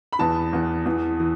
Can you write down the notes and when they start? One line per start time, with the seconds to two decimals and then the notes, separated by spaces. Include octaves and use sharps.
0.13 B5
0.19 E2 E3 A5
0.53 E2 E3
0.85 E2 E3
1.20 E3